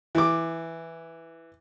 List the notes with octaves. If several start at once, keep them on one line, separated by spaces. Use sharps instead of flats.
E3 D6